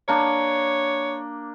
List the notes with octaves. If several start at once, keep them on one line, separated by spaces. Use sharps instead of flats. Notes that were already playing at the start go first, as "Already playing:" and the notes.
A#3 D4 C#5